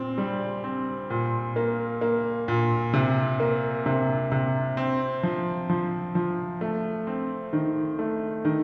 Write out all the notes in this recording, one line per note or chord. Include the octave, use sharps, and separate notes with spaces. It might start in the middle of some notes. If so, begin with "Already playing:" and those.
Already playing: A#2 C4
G3
C4
A#2
A#3
A#3
A#2
C3
A#3
C3
C3
C4
F3
F3
F3
A3
C4
D#3
A3
D#3